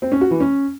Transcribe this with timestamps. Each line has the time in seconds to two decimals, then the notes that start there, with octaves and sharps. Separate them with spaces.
0.02 C4
0.12 C#4
0.21 F#4
0.31 E3
0.40 C#4